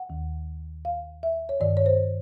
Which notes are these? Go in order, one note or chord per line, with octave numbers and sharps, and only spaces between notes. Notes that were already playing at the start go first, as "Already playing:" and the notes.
Already playing: F#5
D#2 D#3
F5
E5
C#5
G2 D#3 D5
C#5
C5